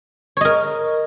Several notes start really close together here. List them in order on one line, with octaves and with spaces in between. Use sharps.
C#5 D#5 A#4